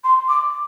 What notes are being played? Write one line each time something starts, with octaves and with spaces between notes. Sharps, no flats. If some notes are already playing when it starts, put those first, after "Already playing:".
C6
D6